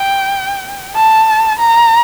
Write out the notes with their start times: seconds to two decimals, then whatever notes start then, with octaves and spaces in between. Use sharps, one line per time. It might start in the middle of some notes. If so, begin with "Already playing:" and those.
Already playing: G5
0.96 A5
1.59 A#5